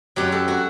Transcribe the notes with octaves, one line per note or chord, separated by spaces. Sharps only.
F#2 F#3 G4
A4
F#3 F#4